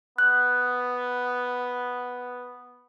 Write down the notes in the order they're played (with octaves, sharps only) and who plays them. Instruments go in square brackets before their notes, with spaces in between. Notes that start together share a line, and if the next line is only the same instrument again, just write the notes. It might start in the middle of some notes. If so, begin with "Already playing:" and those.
[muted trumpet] B3 [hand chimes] F#6